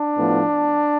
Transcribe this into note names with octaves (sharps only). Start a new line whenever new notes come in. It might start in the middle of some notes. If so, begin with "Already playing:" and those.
Already playing: D4
A2 F3 B3